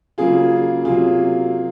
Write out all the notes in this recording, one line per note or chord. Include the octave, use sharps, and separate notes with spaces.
C#3 F#3 A#3 F4 G#4
C3 F#3 A#3 F4 G#4